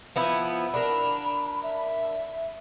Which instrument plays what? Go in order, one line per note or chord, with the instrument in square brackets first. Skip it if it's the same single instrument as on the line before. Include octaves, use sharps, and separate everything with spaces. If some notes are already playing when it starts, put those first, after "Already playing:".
[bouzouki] F3 B3 E4
[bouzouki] D4 A#4 [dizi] B5
[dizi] E5